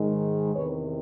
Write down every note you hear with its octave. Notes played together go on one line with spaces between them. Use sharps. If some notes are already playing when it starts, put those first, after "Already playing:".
Already playing: G#2 D#3 G#3
E2 C3 D#3 B4 C#5